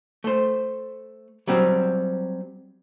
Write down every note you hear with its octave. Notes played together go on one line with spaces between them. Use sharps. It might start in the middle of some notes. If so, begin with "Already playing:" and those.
A3 C5
F#3 G3 C4